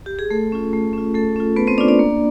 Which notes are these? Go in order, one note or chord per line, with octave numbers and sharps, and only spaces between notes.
G4
G#4
A3 A4
C#4 F4
A3
C#4 F4
A3 A4
C#4 F4
A3 B3 B4
C4 C5
C#4 D4 F4 D5
D4 D5
A#3